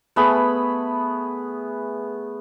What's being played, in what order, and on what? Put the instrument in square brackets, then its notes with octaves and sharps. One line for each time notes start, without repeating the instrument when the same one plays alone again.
[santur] A3 B3 G#4 B5